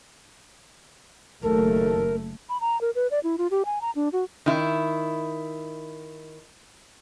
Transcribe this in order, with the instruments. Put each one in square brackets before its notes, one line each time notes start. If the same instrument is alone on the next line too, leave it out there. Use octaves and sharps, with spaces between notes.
[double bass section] F#1 A3 [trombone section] D#2 A4 [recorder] A#4
[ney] B5
A#5
A#4
B4
D5
E4
F4
G4
G#5
A#5
D4
F#4
[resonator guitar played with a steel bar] D#3 E4